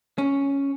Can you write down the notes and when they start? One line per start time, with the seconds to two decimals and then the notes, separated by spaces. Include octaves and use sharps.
0.18 C#4